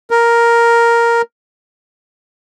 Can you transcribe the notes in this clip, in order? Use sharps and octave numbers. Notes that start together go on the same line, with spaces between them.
A#4